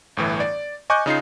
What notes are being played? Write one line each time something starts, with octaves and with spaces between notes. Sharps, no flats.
G1 A2 E3
D5
D#5 G#5 C#6 D6 F#6 G6
C#3 D#4 F4 C7